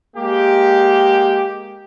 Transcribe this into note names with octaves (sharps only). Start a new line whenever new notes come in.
G#3 A#3 G4